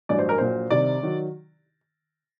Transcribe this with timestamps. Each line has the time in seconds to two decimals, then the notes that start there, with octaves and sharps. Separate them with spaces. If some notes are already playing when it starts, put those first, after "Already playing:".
0.09 A1 G2 F#3 D5
0.19 C5
0.29 A#4
0.38 A#1 A#2 F#3 C5
0.70 C2 C3 D#3 D5
1.03 D#3 F#3